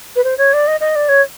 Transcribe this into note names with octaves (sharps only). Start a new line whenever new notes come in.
B4
C5
C#5
D5
D#5
D#5
D5
C#5